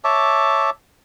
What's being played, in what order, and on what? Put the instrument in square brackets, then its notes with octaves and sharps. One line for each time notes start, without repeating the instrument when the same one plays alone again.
[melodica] C#5 E5 A5 D6